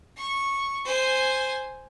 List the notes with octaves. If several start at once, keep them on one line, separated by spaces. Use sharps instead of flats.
C#6
C5 G#5